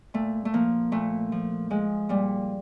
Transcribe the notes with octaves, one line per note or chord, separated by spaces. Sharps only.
A#2 A3
A3
F3 A#3
A#2 A3
F3
F3 G#3
A#2 G3